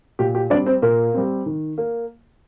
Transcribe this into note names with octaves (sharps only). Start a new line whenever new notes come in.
A#2 G4
G4
G3 C4 D4 D5
C4 C5
A#2 A#3 A#4
G3 C4
D#3
A#3